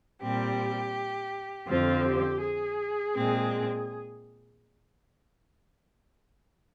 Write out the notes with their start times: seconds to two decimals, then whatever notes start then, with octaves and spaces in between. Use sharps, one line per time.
0.20 A#2 G3 C4 G4
1.67 F2 D3 F3 C4 F4
2.04 G4
2.40 G#4
3.13 A#2 G#3 C4